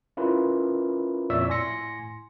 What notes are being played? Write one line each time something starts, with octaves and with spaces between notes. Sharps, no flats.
C#4 E4 F4 A#4 B4
F2 A#2 C#5 D5 E5 E6
A2 G#5 C6 A#6 C#7